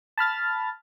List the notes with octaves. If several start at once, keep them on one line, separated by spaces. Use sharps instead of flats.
A5 B5 F6 A6